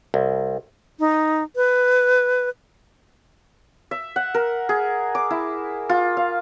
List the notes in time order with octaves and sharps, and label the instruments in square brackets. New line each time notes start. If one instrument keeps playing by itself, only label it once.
[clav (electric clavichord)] C2
[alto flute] D#4
B4
[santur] E5
F#5
A#4
G#4
D6
E4
F4
F5